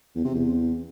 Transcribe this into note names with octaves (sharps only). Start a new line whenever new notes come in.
E2
C3
E2